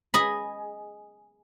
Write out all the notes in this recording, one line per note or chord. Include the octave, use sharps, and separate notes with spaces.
G#4 D#5 B5